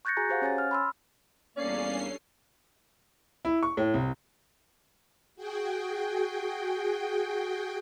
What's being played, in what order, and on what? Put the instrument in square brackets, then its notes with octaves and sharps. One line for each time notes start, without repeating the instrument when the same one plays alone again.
[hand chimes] C#6 F#6 G6 A6 A#6 C#7
F#4 G#4 G#5 A#5
G4 C5 F5 F#5
C#4 C#5 G#5 A6
F6
B5 C6 E6
[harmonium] E2 A#3 [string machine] G3 D4 A4 [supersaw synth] C#4 C7 [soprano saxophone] D5
[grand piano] E4
C#6
A2
C2
[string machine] F#4 G#4 G5